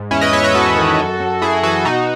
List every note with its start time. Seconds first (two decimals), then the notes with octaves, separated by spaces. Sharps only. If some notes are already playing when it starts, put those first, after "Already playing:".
Already playing: G#2
0.11 E2 C#4 E4
0.21 B4 D#5
0.33 E2 C#5 E5
0.44 B4 D#5
0.54 E2 F#4 A4
0.76 D#3
0.99 F#2
1.20 F#2
1.42 F#2 E4 G#4
1.63 E3 F#4 A4
1.85 B2 D#4 F#4